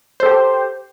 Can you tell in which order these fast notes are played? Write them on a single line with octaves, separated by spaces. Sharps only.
C5 A4 G4